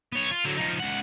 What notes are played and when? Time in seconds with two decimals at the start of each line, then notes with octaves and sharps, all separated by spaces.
0.12 B3 C#5
0.31 F4
0.45 D3 F#3
0.57 F3 D#4
0.79 C#2 F#5